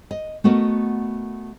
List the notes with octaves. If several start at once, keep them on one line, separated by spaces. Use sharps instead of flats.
D#5
A3 B3 F#4 A#4 D#5